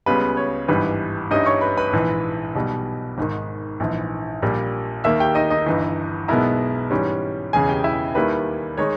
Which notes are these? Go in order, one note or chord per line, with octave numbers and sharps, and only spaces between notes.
C#2 C#3 G3 B3 B4
C#5
G#1 G2 E3 G3 B4
G2 G3 C#4 D#4 E4 D#5
C#5 C#6
B4 B5
B4 B5
A#1 G#2 E3
B1 B2 G3
G#1 G#2 D#3
A#1 G#2 E3
A#1 A#2 G3
D#2 D#3 A#3 E5 E6
G4 G5
D#4 D#5
D#4 D#5
G1 G2 E3
B1 B2 G#3 B3 E4 A#4 A#5
G#2 E3 G3 C#4
E1 E2 C#3 G#4 G#5
G4 G5
E4 E5
D#2 D#3 G3 A#3 E4 B4
D#3 G#3 D#4 C#5